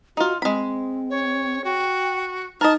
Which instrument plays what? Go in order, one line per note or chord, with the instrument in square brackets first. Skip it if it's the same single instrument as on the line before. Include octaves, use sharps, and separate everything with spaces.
[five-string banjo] D#4 F4 [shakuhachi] F#4
[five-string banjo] G#3 B5 [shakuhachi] C4
[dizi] C#5
[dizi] F#4 [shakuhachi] G5
[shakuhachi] D#4 [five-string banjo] A#4 D#5 [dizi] A5